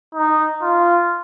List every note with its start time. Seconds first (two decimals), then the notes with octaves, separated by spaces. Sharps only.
0.15 D#4
0.62 F4